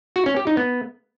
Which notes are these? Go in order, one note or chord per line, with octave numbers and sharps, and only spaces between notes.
F#4
C#4
G4
D#4
B3